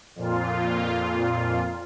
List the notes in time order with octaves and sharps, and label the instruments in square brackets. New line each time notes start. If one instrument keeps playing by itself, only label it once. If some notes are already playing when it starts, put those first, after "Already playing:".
[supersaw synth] F2 A#2 F4